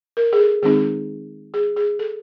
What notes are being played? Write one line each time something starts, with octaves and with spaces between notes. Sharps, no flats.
A#4
G#4
A4
D#3 G#3 C4 D#4 G#4
G#4
G#4
A4